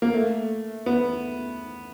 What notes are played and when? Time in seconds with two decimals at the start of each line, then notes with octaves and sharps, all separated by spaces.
0.02 A#3
0.14 A3
0.86 B3